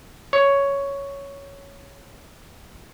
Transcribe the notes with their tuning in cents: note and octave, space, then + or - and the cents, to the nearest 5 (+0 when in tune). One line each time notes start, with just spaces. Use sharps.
C#5 +5